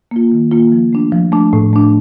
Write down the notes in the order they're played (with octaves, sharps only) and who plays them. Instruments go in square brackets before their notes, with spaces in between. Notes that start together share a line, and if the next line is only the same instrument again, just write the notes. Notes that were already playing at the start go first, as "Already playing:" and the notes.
[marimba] A#3 F4
D#3
A#3 F4
F3
A3 D4
F3
A3 D4
A2
A3 D4